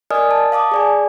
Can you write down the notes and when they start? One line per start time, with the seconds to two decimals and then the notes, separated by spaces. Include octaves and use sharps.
0.11 A#4 D5 D#5 G#5 D#6 F6
0.31 A5
0.52 F5 A5 D6 D#6
0.72 G#4 D5 G#5